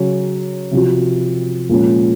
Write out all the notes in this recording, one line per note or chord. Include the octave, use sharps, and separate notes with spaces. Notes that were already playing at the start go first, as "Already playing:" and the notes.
Already playing: C#3 F#3 C#4
C3 F3 C4 F#4
A#2 F3 G#3 C#4